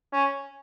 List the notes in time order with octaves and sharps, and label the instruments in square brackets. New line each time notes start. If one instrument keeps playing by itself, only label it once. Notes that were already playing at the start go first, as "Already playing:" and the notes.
[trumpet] C#4